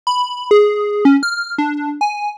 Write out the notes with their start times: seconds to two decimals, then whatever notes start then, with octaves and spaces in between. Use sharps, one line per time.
0.07 B5
0.51 G#4
1.05 C#4
1.23 F6
1.58 D4
2.01 G#5